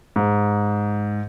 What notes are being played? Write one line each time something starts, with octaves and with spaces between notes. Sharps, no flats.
G#2